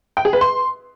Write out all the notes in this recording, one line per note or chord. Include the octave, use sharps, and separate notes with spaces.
G5
G#4
B4
C6